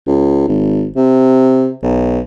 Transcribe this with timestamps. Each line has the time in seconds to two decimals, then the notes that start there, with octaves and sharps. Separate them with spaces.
0.07 C#2
0.48 G#1
0.96 C3
1.83 B1